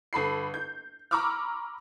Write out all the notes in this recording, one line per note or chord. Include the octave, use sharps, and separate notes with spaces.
G1 A4 B5 C7
G6
A#5 B5 C#6 D6 E6 F6